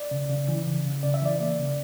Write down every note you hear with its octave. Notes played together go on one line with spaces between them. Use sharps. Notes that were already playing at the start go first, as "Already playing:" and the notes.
Already playing: D5
C#3
C#3
E3
C#3
C#3
C#3 D5
E5
E3 D5
A#3 D5
C#3